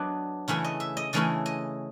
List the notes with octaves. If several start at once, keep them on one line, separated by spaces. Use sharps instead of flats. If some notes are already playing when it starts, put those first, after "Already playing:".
Already playing: F#3 B3 D4 D#5
C#3 E3 A3 C#4 E4 E5
D#5
E5
D#5
C#3 E3 A3 C#4 E4 D#5
D#5